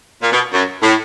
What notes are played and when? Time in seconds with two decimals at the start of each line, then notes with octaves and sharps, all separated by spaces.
0.22 A#2
0.32 B2
0.53 F#2
0.82 A2